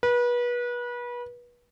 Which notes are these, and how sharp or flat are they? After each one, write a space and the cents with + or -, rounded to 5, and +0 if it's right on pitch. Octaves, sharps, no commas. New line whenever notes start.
B4 -30